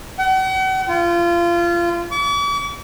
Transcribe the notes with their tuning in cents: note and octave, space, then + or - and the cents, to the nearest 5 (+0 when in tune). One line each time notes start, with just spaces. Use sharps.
F#5 +40
F4 -25
D6 -45